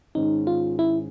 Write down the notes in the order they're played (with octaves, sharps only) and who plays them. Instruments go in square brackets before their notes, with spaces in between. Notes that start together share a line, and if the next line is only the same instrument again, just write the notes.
[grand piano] G#2 D#3 G#3 C#4 [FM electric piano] D#4
[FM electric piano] F4
E4